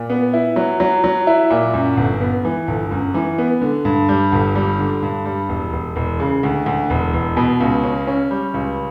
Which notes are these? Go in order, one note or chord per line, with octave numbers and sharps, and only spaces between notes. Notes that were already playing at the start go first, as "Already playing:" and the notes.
Already playing: A#2
B3
E4
F#3
F#3
F#3
E4
A#2
F#2
G1
B3
E3
G1
F#2
E3
B3
D3
G2
G3
G1
G3
D3
G2
G3
E1
E1
E1
C#3
D2
D2
E1
E1
B2
C#2
C#4
C#4
G3
C#2